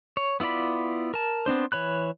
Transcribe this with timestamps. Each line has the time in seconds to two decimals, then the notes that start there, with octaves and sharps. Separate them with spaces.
0.17 C#5
0.40 B3 E4 F4 D5 B5
1.14 A#4 A5
1.46 B3 C4 D4 C5
1.72 E3 C#5 B5 F#6